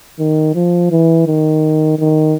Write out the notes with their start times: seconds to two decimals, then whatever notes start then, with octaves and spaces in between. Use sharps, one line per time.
0.19 D#3
0.55 F3
0.91 E3
1.27 D#3
1.99 D#3